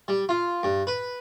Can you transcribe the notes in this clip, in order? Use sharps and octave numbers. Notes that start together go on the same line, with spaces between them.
G3
F4
G2
B4